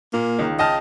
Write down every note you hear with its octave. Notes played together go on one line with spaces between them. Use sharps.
A#2 A#3
C#2 D#3
D#5 G5 A5 F6